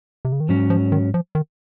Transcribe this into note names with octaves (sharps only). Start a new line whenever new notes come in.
C3
C#3
D#3
G#2 F3 F#3 C#4
F3
D#3
F3
D#3